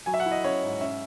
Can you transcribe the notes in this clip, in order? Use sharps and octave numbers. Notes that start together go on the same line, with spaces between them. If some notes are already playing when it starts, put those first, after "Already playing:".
F#3 G#5
E5
F#5
E4
D#5
C#4 C#5
G#2
C#4 E5